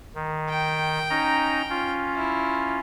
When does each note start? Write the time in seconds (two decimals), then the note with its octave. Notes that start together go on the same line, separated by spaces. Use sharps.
0.15 D#3
0.49 G5
1.10 C#4 D#4 A#5
1.70 C#4 F4
2.15 E4